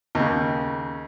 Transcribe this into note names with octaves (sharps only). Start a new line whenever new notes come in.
D#2 C#3